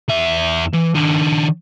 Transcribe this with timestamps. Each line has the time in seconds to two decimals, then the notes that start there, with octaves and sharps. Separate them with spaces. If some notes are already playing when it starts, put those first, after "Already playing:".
0.09 E2 E5
0.74 E3
0.95 D#3 D4